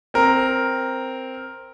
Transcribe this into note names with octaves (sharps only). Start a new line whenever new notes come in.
C4 A#4